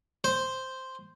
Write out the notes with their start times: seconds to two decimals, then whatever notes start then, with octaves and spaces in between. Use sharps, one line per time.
0.24 C5